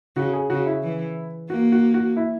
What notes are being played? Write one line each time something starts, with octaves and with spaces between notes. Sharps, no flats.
C#3 F#4
G#4
C#3 F#4
E4
E3
A#3 F#4
F#4
F#4
E4